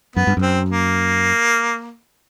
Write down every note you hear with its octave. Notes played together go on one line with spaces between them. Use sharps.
F#2 B3
G2
F#2
C4
A#3